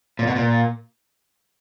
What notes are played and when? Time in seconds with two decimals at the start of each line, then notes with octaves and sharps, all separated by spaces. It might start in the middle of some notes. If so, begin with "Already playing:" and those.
0.19 A#2
0.27 B2
0.36 A#2